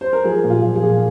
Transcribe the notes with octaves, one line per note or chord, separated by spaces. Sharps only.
C5
A#4
F3 G#4
A#2
F4
F3
G#4
A#2